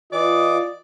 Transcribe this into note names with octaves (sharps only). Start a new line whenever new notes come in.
E3 F4 D5 D#5 D6